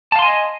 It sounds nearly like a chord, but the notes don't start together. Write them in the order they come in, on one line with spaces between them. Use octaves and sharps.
A5 F5 C6 G#5 D#5